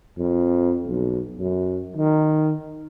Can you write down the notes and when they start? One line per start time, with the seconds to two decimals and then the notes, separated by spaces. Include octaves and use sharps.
0.18 F2
0.88 B1
1.38 F#2
1.97 D#3